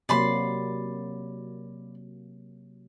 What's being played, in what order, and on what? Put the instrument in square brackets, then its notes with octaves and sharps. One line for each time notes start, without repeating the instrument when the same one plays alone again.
[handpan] C3 F#3 A#3 [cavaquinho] D5 B5 C6